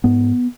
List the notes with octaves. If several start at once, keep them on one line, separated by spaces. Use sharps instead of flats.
G#2 B3